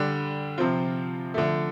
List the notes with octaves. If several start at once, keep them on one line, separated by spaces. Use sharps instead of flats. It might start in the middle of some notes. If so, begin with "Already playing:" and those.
Already playing: D3 G3 D4
C3 F3 C4 F4
D3 F3 A3